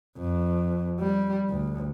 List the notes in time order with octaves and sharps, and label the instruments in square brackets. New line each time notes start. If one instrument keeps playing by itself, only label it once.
[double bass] F2
G3
D2